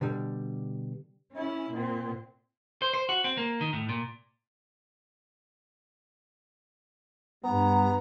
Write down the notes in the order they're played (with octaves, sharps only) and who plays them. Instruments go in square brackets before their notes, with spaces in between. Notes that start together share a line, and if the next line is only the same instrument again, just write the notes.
[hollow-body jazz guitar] B2 D3 G3
[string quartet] C#4 E4
A#2 C4
[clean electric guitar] C5
C5
F#4
C4
A#3
D#3
A2
A#2
[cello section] G2 [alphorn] B3 [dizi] A#5